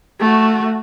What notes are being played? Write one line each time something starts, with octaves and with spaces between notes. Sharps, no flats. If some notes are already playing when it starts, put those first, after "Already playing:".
A3 F#4